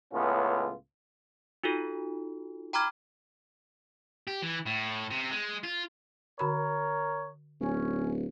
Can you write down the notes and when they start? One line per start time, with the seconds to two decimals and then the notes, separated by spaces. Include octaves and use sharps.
0.13 C#2 A2 B3 C#4 F4
1.64 D#4 F4 F#4 A4
2.73 G5 A#5 B5 D6 F6 G#6
4.27 G4
4.42 E3
4.66 A2
5.10 C3
5.31 G#3
5.63 F4
6.39 D3 F#4 A#4 C#5 B5
7.61 D1 C#4